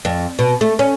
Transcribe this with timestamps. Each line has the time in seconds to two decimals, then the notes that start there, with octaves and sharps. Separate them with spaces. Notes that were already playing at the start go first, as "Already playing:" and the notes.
0.05 F2
0.39 B2
0.61 A3
0.79 C#4